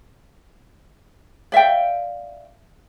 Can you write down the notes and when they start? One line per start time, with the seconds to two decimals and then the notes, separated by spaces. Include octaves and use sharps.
1.52 D5 E5 F5 G5